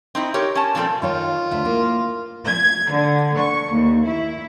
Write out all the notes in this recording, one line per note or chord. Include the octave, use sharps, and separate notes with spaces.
C4 D#4 E4
G4 A#4 C#5
C#4 A5
A#2 F3 G3 C4 G4 A4
D#3 D#4 F4 C#5
D2 E5
A#3 E4
G#6
D3
C#6
D#2
E4